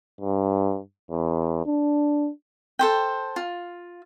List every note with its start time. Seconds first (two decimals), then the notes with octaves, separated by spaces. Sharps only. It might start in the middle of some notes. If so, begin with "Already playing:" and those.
0.21 G2
1.11 E2
1.66 D4
2.79 A4 C5 G5
3.36 F4